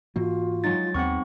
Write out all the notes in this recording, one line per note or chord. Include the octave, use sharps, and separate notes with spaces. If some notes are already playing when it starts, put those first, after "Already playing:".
G#2 E3 A#3 F4 F#4
F#3 G#3 D#4 A6
D#2 B3 C4 G#4 F#5 C#6